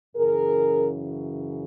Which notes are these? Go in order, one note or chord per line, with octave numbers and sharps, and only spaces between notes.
F#2 C#3 E3 G#4 A#4